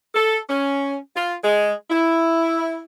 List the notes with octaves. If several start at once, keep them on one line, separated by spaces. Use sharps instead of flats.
A4
C#4
F4
G#3
E4